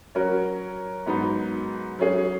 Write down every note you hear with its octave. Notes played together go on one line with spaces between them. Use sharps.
F#3 C#4 F#4 A#4
G#2 F#3 B3 D#4
F#3 C#4 G#4